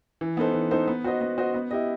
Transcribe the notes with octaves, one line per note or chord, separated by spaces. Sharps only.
E3
B3 D#4 A4 C5
E3
B3 D#4 A4 C5
B3
F#4 C5 D#5
B3
F#4 C5 D#5
B3
E4 G4 D#5